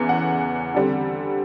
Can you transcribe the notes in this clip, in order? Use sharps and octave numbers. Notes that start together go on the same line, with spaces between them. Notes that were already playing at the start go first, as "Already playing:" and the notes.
Already playing: E2 C#3 E3
F#5
D3 G3 C4